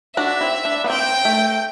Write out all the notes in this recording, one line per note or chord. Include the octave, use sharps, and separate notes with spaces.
D4 F#4 E5
C4 E4
D4
B3
C4 G5
A3